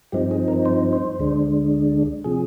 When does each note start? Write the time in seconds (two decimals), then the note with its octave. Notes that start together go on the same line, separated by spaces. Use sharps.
0.12 G2 F3 C4 D#4 G4
0.31 G#4
0.48 A#4
0.66 C5
0.93 C5
1.19 D2 D3 G#3 D4
2.24 C3 F3 G#4